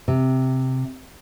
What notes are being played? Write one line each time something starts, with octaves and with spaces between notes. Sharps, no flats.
C3